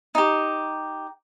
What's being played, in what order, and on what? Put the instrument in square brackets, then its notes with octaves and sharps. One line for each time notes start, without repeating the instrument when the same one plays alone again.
[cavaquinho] D#4 G4